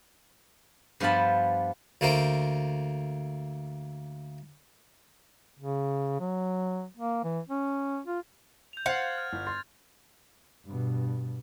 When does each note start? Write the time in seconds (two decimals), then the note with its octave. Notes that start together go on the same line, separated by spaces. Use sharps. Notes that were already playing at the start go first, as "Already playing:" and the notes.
1.00 G2 F3 B3 F4 A5 B5
2.01 D2 A3 A#3 C5 G5
5.59 C#3
6.20 F#3
6.97 A#3
7.24 E3
7.49 C#4
8.07 F4
8.73 G6 F7
8.86 C5 F5 F#5 F6 G#6 A6
9.02 G#6
9.18 F6
9.33 G1
9.47 C6 A6
10.66 G2 B2